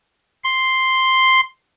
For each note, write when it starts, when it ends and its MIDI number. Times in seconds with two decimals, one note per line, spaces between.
0.44 1.41 84